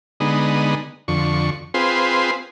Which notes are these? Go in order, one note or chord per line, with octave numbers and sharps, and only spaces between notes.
D3 G#3 B3 D#4
F2 D3 C#6
C4 F4 G#4 B4 C5